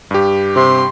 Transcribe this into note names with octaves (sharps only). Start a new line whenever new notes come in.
G2 G4
C3 C6